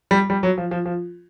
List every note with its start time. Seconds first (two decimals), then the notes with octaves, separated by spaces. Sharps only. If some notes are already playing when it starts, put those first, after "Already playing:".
0.11 G3
0.30 G3
0.43 F#3
0.58 F3
0.71 F3
0.86 F3